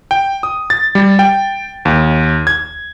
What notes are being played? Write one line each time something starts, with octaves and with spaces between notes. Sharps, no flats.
G5
D#6
A6
G3
G5
D#2
G#6